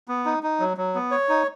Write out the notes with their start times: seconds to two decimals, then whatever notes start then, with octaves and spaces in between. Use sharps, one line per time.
0.08 B3
0.25 D#4
0.43 D#4
0.59 F#3
0.77 F#3
0.95 B3
1.11 C#5
1.29 D#4